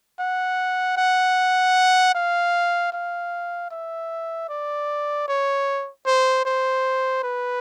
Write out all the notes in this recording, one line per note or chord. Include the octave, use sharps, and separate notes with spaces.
F#5
F#5
F5
F5
E5
D5
C#5
C5
C5
B4